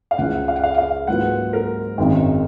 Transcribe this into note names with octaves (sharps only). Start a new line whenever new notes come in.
F5
C#2 C#3 F3 F#5
F5
F#5
F5
F5
G#2 F#3 A#3 F4 B4 F#5
A#4
G#1 F#2 D#3 G#3